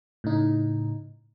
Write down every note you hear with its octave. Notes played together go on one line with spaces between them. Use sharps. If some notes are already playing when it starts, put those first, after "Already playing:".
A2 C#3 D#4